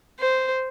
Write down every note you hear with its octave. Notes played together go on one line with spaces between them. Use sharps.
C5